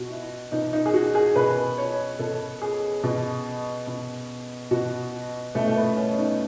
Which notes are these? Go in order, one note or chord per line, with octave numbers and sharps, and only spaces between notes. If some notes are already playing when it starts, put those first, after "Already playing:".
Already playing: B2 F#4
E4
B2 D#4
D#4
G#4
F#4
G#4
B2 B4
C#5
B2 A4
G#4
B2
B2
B2 F#4
B2 A3
A3
B3
C#4
D#4